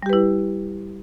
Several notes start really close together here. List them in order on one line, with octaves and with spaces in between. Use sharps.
G3 G4 B4 E4